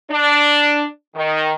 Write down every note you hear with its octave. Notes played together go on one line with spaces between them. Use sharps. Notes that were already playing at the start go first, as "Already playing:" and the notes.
D4
D#3